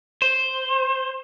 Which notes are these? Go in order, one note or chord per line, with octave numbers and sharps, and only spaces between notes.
C5